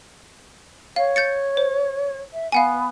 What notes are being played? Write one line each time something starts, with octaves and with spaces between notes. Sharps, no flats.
C#5 F5
G6 A6 C#7
C5
E5
B3 F5 F#5 G#5